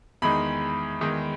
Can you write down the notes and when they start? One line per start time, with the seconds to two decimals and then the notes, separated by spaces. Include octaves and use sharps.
0.22 E2 D#3 G#3 D#4 B5
1.01 E2 D#3 G#3 D#4